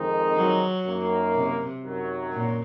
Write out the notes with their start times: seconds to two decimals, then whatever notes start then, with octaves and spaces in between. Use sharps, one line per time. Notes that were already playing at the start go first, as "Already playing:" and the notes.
Already playing: F2 D#3 G#3 C4 D#4
0.36 F#3
0.85 F#2 D#3 A#3
1.35 C3
1.84 F#2 D#3 F#3
2.33 A#2